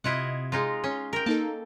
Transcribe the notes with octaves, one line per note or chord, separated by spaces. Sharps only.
C3 E4 F4 D#5 F#5 G#6
G#3 D#4 F4
C#4 C6
A#4 G5
A#3 D#4 A4 A5